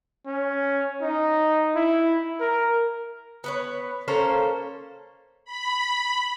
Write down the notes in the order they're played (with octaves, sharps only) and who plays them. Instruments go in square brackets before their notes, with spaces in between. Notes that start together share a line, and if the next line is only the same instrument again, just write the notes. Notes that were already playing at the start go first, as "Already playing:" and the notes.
[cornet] C#4
D#4
E4
A#4
[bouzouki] B3 B4 C#5
A#3 C#4 A4 C5
[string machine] B5